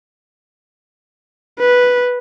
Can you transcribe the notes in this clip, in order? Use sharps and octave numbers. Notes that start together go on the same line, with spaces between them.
B4